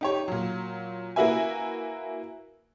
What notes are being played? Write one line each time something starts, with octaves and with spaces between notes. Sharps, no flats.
D#4 G4 C#5
A#2 F#3
A#3 E4 F#4 B4 E5 G#5